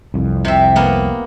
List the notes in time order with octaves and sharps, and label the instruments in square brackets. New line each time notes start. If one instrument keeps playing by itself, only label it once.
[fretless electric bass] C2 F2
[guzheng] C3 E5
A#3 B3